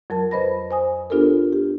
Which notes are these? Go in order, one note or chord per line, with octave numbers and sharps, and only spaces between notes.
F2 F#3 A#4 A5
F2 B4 C5 D#5 B5 A#6
C5 G#5 D#6
B3 D4 F4 G4 A4 A#4
G4